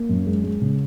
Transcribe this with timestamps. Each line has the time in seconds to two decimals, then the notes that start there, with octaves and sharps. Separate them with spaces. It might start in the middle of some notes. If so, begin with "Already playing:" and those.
Already playing: A#3
0.09 F#2
0.26 G#3
0.43 G#3
0.61 C#3